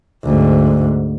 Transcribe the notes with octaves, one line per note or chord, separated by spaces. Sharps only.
D2 G#2